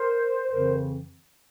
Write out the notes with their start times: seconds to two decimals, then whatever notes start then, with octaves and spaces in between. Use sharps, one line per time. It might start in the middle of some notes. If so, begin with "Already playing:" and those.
Already playing: A#4 C5
0.50 F2 C#3 E3 A#4 C5